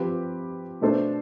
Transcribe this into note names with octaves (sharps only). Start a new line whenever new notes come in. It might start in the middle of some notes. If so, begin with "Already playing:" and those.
Already playing: F3 C4 G4 B4
B2 A3 D4 A4 C5